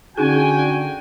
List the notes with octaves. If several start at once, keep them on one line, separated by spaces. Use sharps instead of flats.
D3 C#4 D#4 F#4 G#4 G5 G#5